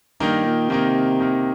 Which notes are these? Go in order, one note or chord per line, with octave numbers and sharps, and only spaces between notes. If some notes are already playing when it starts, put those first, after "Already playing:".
G2 D#3 A#3 D#4
A#2
C3 D#3 A#3 D#4
D#3 A#3 D#4